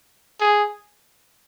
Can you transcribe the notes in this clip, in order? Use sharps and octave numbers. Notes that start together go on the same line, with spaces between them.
G#4